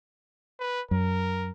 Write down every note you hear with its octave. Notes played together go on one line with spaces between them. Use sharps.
B4
F#2 A#4